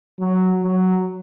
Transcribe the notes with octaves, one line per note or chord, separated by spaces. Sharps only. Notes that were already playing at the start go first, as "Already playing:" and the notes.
F#3
F#3